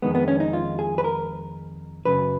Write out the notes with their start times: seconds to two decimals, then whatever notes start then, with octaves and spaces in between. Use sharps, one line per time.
0.02 F2 D#3 G#3 B3
0.15 B3
0.28 C#4
0.40 D#4
0.53 F4
0.79 G#4
0.98 B4
1.04 A#4
2.05 F#2 C#3 F#3 B4